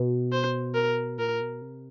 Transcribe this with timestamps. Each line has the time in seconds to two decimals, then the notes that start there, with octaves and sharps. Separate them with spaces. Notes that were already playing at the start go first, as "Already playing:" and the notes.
Already playing: B2
0.32 C5
0.75 A#4
1.18 A#2 A#4
1.41 B2
1.61 C3